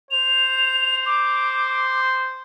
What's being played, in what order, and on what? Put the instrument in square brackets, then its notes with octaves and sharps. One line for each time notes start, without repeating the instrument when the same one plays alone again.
[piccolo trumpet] C5 [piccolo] F7
[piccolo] D6